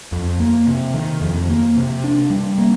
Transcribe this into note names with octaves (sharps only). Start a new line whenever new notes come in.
F2
A#3
C3
D#3
F2
A#3
C3
D4
G3
A#3